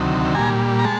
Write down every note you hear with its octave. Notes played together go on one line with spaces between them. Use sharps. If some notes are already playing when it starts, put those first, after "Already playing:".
Already playing: D2 C3 D#3 F#3
A#2 G3 G#5 A#5
A#5
G#3 A5